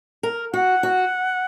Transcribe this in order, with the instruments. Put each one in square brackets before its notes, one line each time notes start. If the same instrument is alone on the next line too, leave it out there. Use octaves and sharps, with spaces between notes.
[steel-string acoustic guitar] A#4
[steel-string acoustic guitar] F#4 [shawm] F#5
[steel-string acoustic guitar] F#4